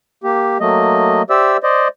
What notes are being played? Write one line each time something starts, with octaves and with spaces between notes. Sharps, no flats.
A#3 G4
F#3 A3 A#3 D#5
G4 C5 D5 E5 E6
C5 D5 D#5